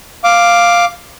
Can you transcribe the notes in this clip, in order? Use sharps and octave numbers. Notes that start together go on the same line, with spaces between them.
F5 D6